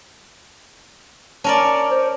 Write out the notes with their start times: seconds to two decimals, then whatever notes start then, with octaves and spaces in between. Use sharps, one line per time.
1.44 C#4 A#4 D5 A5
1.91 C5